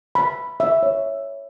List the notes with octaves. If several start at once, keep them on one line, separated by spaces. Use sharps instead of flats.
B5
E5
C#5